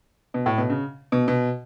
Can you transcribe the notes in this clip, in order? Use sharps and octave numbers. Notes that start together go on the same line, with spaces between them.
B2
A2
B2
C#3
B2
B2